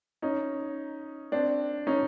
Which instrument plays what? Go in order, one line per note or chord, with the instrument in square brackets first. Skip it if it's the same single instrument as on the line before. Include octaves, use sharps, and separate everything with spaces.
[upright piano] C#4 D#4
C4 D4
C#4 D#4